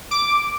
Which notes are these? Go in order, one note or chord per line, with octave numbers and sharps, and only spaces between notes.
D6